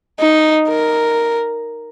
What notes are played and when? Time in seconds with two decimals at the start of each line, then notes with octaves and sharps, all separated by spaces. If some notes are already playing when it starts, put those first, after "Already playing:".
0.19 D#4
0.68 A#4